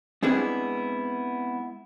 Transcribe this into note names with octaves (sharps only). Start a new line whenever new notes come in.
G#3 B3 C4 D4 E4 G#4